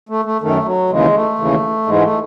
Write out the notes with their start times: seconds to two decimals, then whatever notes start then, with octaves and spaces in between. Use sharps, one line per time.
0.09 A3
0.25 A3
0.41 F#2 D#3 A3
0.65 F#3
0.90 D#2 C#3 E3 G#3
1.14 A3
1.39 D#2 C#3 E3
1.86 G#2 E3 G#3
2.02 A3